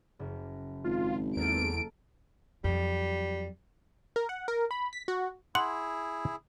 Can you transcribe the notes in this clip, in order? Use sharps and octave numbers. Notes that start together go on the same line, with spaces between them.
F#1
G#1 F4
E2 A#3 A4 D7
F2 F#3 G3
A#4
F#5
A#4
B5
B6
F#4
E4 G#4 F#5 C6